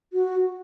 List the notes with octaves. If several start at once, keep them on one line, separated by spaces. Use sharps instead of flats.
F#4